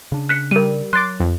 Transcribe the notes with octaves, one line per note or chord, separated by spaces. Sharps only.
C#3 D4
F#6 B6 C#7
G3 A#4 D#7
F#3 C6 D6 F#6 A6
F2